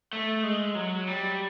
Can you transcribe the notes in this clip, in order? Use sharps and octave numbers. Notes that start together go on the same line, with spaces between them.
A3
G#3
F#3
G3